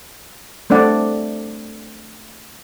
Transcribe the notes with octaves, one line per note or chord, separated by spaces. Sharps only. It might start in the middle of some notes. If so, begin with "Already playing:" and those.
A3 C4 D4 D5 F#5